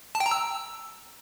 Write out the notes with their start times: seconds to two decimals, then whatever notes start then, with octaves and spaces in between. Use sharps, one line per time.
0.15 A5
0.20 G5
0.26 A#5
0.31 E6